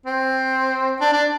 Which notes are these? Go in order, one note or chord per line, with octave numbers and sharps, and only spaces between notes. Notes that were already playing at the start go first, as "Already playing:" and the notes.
C4
D4
D4